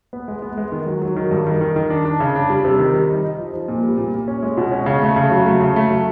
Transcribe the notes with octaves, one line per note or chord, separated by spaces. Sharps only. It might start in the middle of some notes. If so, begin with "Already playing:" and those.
B3
G#3
B3
G#3
D#3
F#3
F#3
D#3
G2
D#3
D#3
D#3
D4
D4
C#3
D4
G3
C3
D#3
G3
D#4
D#4
F3
F3
A#2
G3
A#2
A#2
C#4
G#3
B2
C#4
C#3
A3
C#3
F#3
A3
C#3
A3
F#3